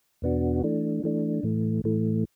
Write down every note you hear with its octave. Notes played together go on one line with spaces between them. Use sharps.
E2 B2 B3 D4 F#4
E3 A3 D4
E3 A3 D4
A2 E3 A3
A2 E3 A3